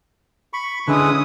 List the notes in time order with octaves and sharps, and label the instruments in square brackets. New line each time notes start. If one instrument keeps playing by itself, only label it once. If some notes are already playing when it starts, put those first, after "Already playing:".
[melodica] B5 C#6
[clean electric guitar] D3 [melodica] G#3 E4 B4 [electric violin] C#4 D#6